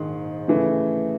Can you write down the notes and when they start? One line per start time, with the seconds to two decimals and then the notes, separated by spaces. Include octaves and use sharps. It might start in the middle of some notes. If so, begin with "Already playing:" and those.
Already playing: A#1 G#2 D#3 G#4
0.48 C#3 E3 A3